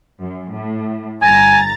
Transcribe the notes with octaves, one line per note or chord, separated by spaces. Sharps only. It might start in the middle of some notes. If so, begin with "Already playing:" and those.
F#2
A2
G1 G#5 A#5 A6